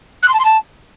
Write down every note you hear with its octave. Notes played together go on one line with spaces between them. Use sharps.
F#6
C6
A5
C6
A5